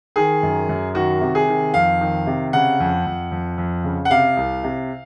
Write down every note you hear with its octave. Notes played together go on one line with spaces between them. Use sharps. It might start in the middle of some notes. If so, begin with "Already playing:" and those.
D#3 G#4
F#2
F#2
D#3 F#4
C3
G#4
D#3
F2 F5
D#3
C3
C#3 F#5
F2
F2
F2
F2
C#3
F#5
C3 F5
C2
C3